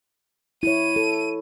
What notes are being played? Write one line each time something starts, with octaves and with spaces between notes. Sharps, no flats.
E4 C#5 D#7
A4